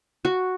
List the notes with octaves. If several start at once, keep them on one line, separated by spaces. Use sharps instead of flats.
F#4